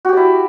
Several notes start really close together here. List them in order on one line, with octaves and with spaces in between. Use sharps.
F#4 G4 D5 E4